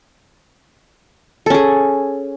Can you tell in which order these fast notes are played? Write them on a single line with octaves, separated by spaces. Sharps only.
A4 C#4 G#4